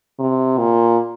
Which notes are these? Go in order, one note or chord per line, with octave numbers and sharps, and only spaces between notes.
C3
A#2